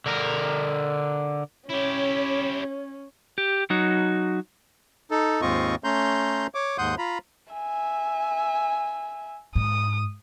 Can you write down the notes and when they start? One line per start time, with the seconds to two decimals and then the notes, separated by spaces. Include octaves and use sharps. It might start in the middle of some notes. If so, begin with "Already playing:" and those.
0.06 D3 A#4
1.69 C#4 E4 G4 C#5
3.38 G4
3.70 F#3 D#4 F#4
5.11 D#4 A4
5.42 D#2 G#2 C4 F4 D#5 C#6
5.84 A3 C#4 A#5 C6 G6
6.55 C#5 D6
6.78 D#2 G#2 F#5 C6 D#6 G6
6.98 F4 A#5 B5
7.53 E5 G#5
9.55 G#2 D#6